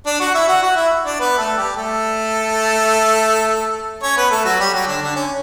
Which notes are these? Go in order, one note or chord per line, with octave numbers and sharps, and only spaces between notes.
D4 D5
F#4 F#5
E4 E5
F#4 F#5
F#4 F#5
E4 E5
D4 D5
B3 B4
A3 A4
G3 G4
A3 A4
C#4 C#5
B3 B4
A3 A4
F#3 F#4
G3 G4
F#3 F#4
D3 D4
D3 D4
C#4